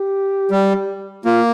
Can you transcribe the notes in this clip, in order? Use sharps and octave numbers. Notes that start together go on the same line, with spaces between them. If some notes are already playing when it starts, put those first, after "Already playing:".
Already playing: G4
G3
A#3 F4